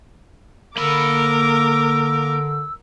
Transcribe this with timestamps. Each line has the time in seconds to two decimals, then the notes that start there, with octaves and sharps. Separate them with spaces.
0.77 D3 A#3 A#4 B5 D6 E6